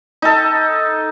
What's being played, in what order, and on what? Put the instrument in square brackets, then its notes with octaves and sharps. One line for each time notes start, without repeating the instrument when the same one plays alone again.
[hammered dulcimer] D#4 A4